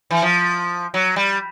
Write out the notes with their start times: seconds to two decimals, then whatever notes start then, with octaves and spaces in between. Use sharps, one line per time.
0.11 E3
0.22 F3
0.94 F#3
1.16 G3